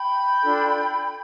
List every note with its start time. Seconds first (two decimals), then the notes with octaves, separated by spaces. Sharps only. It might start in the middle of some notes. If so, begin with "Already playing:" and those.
Already playing: G5 B5
0.43 D4 F4 A4